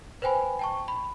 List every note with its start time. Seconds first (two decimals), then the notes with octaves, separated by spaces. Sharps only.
0.22 B4 C5 G5 G#5 B5
0.59 G5 A5 C#6
0.88 B5